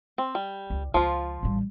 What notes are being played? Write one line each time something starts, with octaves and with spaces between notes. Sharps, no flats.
C4
G3
C#2
C#2 F3 F4
A1 G3